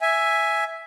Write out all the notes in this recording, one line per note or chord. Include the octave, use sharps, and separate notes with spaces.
E5 G#5